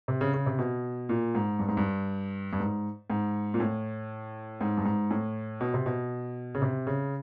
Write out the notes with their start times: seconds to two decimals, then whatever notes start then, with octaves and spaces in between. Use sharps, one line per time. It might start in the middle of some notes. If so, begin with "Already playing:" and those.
0.08 C3
0.21 C#3
0.34 C#3
0.46 C3
0.59 B2
1.09 A#2
1.35 G#2
1.59 G2
1.68 G#2
1.77 G2
2.53 G2
2.60 G#2
3.10 G#2
3.54 A#2
3.60 A2
4.61 G#2
4.77 G2
4.85 G#2
5.11 A2
5.61 B2
5.74 C3
5.86 B2
6.55 C#3
6.62 C3
6.87 C#3